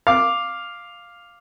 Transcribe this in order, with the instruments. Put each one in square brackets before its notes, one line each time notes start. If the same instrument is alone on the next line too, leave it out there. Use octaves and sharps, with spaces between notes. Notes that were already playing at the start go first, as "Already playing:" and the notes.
[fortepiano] F5 D6